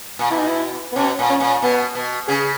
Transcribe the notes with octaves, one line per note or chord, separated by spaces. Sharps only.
A#2
B2 E4
D#4
E4
B3
B2 C#4
A#2
C#4
A#2
B2 B3
B2
C#3 G#4